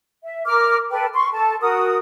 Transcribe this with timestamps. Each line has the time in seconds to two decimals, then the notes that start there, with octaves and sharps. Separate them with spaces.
0.23 E5
0.46 A#4 D6 F6
0.91 A4 B4 G5
1.15 C6 C#6
1.32 A4 A5
1.61 F#4 A#4 D#6